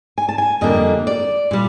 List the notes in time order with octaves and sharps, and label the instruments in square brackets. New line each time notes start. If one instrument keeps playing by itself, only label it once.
[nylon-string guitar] G#5
A5
G#5
F2 D3 G3 A#3 D#5
D5
A#2 G3